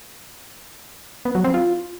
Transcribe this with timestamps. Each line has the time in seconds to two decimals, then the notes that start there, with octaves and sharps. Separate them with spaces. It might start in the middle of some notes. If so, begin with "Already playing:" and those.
1.25 B3
1.35 F#3
1.44 C4
1.54 F4